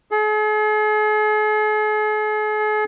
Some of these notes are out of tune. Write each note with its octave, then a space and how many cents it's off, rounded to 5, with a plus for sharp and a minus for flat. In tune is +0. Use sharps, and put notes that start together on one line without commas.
G#4 +45